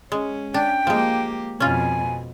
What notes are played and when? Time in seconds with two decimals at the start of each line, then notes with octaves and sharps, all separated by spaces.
0.12 G#3 C#4
0.54 D4 G5
0.87 F3 G#3 A#3 G4
1.60 F2 B2 C#4 F4 G#5